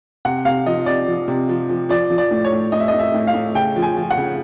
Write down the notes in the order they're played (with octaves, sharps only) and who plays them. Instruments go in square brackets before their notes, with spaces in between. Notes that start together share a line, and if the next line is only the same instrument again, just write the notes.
[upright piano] C3 F#5
C3 F5
F3 D#5
C3 D5
F3
C3
F3
F3
F3 D5
F3
D5
A2
C#5
A2
A2 D#5
E5
D#5
A2
E5
A2
F5
A2
C#3 G5
F3
G#5
F3
F#5
C#3